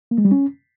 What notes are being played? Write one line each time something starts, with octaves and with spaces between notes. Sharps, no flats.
A#3
G#3
G3
C#4